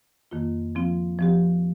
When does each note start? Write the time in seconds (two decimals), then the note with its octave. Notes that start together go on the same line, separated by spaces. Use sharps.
0.31 F2 D#3 A#3 F4
0.75 F3 C4 F4
1.19 F3 C4 G4